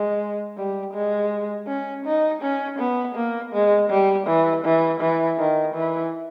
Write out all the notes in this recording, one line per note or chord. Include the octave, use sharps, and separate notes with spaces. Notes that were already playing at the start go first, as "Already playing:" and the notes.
Already playing: G#3
G3
G#3
C#4
D#4
C#4
B3
A#3
G#3
G3
E3
E3
E3
D#3
E3